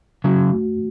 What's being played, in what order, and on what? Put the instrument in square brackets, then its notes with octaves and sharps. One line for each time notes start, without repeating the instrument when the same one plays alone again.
[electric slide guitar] C#3 F#3 [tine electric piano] F#4
[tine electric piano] A3